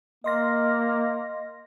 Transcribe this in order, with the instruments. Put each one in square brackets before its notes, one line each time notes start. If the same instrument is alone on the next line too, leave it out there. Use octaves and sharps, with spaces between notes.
[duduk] A#3 [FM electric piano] D#5 C6 A#6